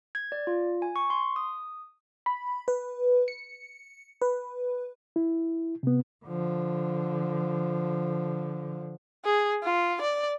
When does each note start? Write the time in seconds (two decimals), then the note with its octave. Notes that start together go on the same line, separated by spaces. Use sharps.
0.15 G#6
0.32 D5
0.47 F4
0.82 G#5
0.96 C#6
1.10 C6
1.36 D#6
2.26 B5
2.68 B4
3.28 C#7
4.22 B4
5.16 E4
5.83 C3 B3
6.25 D3 F3
9.25 G#4
9.63 F4
10.01 D5